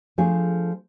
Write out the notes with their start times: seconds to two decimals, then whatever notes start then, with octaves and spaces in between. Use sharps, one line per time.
0.18 F3 A3 D4 G#4